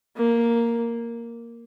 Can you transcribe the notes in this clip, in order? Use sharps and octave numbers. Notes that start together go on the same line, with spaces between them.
A#3